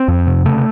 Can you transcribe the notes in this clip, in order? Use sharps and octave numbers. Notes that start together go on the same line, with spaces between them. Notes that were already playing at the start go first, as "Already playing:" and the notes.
Already playing: C4
F2
C3
C#3 A3